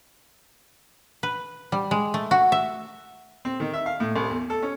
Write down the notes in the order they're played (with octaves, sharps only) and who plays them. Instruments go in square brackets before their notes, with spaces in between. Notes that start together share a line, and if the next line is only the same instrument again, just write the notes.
[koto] B4
G3
G#3
A3
F#4
E5
[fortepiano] C4
D#3
E5
F5
A2
C2
E2
A4
C#4